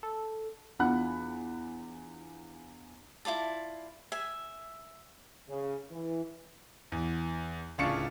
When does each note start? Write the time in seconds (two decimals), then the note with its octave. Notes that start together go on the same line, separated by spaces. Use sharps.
0.03 A4
0.79 E2 D4 F4 F#5 B5 F#6
3.25 E4 F4 D5 A5
4.12 E5 G#5
5.49 C#3
5.91 E3
6.92 E2
7.78 D1 C#3 D4 F4 C#6 C#7